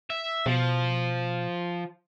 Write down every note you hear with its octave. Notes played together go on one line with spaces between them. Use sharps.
E5
B2 F3